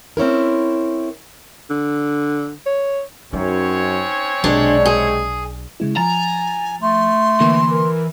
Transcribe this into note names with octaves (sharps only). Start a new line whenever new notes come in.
C4 C#4 E4 A#4
D3
C#5
F#2 C4 C#4 D#4 C#5
B1 C3 G#3 D4
G#4
C#3 G#3 E4
F3 G#5 A#5 A6
A3 C6
D3 E3 A#3
A#4